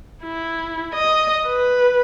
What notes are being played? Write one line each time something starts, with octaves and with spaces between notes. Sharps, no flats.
E4
D#5
B4